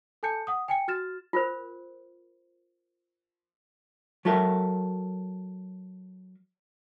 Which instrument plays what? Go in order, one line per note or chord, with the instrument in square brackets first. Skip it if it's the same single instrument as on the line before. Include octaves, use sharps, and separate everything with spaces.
[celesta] A4 G#5 A5 G6 C#7
F#5 D#6
G5 G#5 C#7
F#4 F6 A6 E7
[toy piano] F4 A#4 C5
[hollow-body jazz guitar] F#3 G4 A4 A#4 E5